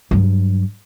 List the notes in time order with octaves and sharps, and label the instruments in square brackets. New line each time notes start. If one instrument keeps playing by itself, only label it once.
[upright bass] G2 F#3